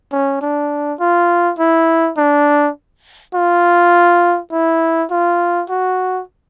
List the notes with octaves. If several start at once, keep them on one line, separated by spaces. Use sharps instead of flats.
C#4
D4
F4
E4
D4
F4
E4
F4
F#4